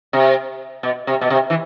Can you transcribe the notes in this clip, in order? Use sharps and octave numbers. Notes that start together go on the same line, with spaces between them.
C3
B2
C3
B2
C3
E3